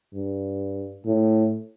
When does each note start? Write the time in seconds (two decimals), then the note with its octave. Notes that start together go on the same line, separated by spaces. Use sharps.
0.14 G2
1.06 A2